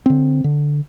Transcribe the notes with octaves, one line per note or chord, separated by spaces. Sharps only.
D3 C4
D3